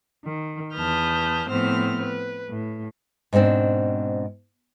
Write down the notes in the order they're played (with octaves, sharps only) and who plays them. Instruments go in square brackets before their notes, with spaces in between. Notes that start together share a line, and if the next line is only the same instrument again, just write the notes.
[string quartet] D#3
E2 B4 A5 D#6 F6 G6
A2 F3 B3 C4 C5 F6
B4
A2
[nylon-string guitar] G#2 B2 A#3 C4 D4